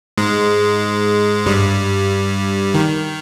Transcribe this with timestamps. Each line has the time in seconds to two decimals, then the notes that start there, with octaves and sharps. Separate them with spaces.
0.18 G#2 G#3
1.46 G2 G3
2.74 D#3